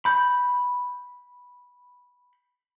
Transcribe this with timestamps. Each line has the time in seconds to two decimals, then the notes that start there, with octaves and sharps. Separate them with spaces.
0.05 B5 G6